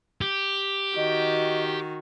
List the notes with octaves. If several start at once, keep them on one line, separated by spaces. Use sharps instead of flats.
G4
D#3 F#4 D#5